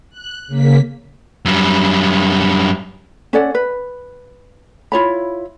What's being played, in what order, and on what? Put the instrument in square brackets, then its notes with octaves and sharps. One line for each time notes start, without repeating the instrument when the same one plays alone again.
[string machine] F#6
C#3 A#3 B6
[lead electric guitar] F#2 G3
[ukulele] C#4 A4 D5 F#5
B4
E4 F4 C#5 B5